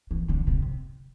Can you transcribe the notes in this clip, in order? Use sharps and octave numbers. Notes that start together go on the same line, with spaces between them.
E3
D3
C3